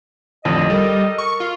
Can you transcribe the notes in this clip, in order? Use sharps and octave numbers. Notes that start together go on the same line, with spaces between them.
A1 F2 D3 D#5
G3 A4 A#4
C#6
F4